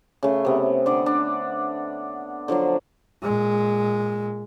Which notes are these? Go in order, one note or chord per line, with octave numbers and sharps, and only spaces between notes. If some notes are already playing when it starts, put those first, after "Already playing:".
C#3 A3
C3 B3
D3 D5
D4
D3 F3 F#3 D4
A#2 G#3